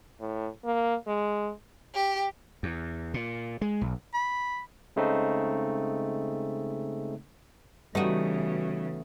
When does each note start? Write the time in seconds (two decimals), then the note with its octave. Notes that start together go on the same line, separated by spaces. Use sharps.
0.20 A2
0.65 A#3
1.07 G#3
1.94 G4
2.63 E2
3.14 A#2
3.61 G#3
3.81 B1
4.14 B5
4.96 C#3 G#3 A3 C4 D#4
7.95 C#3 E3 G3 A3 B3 D#4 F#4 D#6